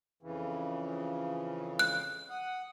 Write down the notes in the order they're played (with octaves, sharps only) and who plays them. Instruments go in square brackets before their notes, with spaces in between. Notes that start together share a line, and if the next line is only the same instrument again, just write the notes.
[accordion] F2 C#3 E3
[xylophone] F#6
[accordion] F#5 D#6